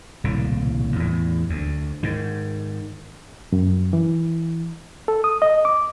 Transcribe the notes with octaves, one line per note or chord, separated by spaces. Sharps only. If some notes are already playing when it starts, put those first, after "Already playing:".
D#1 C2 A2 C#3
E2 A2
D2
G#2 D#3
F#2
E3
A4
D#6
D#5
D6